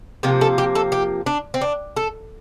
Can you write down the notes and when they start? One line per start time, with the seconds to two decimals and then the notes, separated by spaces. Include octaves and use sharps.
0.23 C3 F3 A#3 G4
0.41 A4
0.58 G4
0.75 A4
0.92 G4
1.26 D4
1.54 C4
1.61 D4
1.96 A4